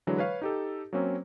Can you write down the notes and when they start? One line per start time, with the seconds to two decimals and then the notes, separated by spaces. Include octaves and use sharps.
0.07 D3 E3 F#3 G#3
0.18 B4 C#5 F5
0.42 D#4 G4 A4
0.93 F#3 A#3 C4 C#4